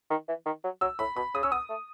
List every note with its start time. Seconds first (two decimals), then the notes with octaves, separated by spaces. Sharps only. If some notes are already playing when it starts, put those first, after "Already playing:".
0.10 D#3
0.28 E3
0.46 D#3
0.64 F#3
0.81 F#3 E6
0.99 A2 B5
1.16 B2 B5
1.34 C#3 D#6
1.43 C#4 E6
1.52 B3 D#6
1.70 A3